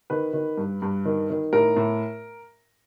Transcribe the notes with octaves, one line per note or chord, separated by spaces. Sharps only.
D#3 B4
D#3
G2
G2
D#3
D#3
A2 A#4
A2